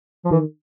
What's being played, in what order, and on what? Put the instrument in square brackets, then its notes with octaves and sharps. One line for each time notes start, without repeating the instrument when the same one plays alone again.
[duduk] F3
[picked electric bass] D#3 [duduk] E3